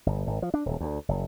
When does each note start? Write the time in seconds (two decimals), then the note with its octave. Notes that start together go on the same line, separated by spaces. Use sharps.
0.06 G1
0.27 G#1
0.42 F3
0.54 D4
0.66 D#1
0.80 D2
1.09 F#1